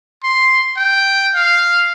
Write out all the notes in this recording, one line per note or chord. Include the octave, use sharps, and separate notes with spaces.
C6
G5
F5